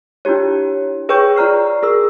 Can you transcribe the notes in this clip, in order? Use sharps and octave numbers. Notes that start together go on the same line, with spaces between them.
D4 E4 F4 G4 C#5
G#4 B4 C#5 G5 C#6 G6
F4 D5 A#5 F6 C7
F#4 G#4 A#4 E6